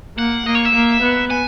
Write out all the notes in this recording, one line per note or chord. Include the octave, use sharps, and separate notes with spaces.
A#3 F#5
A#3 D#5
C#5
E5
A#3
B3
G#5